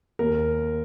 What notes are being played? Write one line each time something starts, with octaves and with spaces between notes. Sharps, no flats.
D#2 A#4